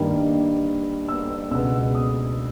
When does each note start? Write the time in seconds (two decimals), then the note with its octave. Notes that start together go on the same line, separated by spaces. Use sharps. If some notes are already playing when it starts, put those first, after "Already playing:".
Already playing: G2 D#3 G3 A#3
1.08 E6
1.51 C#2 B2 G#3 B3 E6
1.95 D#6